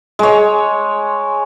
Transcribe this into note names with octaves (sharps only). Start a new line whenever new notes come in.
G#3 C#5